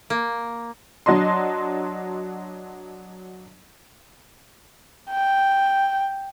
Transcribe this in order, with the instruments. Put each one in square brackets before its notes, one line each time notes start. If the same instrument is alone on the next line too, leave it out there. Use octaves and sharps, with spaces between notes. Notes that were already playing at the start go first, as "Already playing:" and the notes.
[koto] A#3
[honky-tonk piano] F#3 D4 D#5 C6
[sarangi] G5